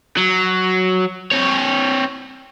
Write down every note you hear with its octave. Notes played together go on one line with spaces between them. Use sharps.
F#3
C4 C#5